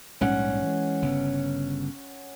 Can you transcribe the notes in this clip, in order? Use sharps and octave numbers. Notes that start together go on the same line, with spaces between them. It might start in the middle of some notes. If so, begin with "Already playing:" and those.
A#1 G#2 G3 C#4 F#5
E3 G#3
G1 C#3 B3